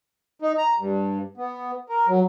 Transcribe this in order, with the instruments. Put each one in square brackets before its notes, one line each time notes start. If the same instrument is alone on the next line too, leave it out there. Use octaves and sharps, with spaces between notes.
[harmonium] D#4
A#5
G2
B3
A#4
F#3